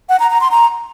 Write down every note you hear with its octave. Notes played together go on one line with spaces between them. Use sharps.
F#5
A#5
A#5
C6
A#5